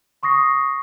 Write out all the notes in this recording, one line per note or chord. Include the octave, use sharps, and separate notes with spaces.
C6 C#6 D#6 A#6 C7